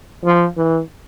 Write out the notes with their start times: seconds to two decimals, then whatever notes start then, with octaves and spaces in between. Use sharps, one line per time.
0.24 F3
0.57 E3